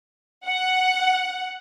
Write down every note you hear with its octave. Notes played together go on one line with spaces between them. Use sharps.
F#5